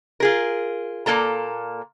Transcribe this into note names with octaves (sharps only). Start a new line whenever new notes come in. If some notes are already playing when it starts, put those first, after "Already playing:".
F4 G#4 A#4
A#2 F#3 A#3 A4 A#5